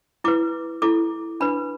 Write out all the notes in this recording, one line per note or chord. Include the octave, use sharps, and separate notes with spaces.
E4 B4 D6
E4 A4 D6
D4 B4 B5